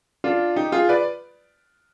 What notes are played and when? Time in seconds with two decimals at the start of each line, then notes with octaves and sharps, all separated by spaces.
0.24 D4 F4
0.56 D#4 G4
0.72 F4 G#4
0.89 B4 D5